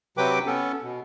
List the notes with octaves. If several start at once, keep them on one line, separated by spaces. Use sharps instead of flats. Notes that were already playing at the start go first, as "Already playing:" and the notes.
C3 F#3 B4 G5 D6
B3 C#4 A4
B2